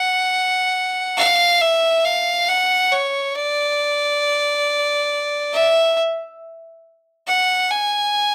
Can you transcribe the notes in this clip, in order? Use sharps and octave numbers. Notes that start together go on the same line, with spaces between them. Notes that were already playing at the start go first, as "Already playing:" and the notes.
Already playing: F#5
F5
E5
F5
F#5
C#5
D5
E5
F#5
G#5